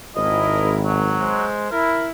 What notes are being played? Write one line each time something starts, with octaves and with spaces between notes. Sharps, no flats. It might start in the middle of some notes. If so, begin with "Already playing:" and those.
G#1 E4 A#4 D#5
F#3
G#3 C5
E4 A#4